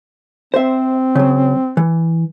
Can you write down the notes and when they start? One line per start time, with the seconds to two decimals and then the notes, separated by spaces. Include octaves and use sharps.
0.54 C4 C5 E5
1.15 C#3 F#3
1.77 E3